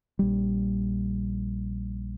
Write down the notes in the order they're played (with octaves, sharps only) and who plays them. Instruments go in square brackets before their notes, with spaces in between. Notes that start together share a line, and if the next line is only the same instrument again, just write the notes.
[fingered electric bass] A#1 G3